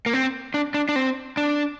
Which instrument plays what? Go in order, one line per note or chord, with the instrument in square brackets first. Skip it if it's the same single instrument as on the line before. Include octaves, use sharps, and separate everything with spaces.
[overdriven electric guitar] A#3
C4
D4
D4
D4
C4
D4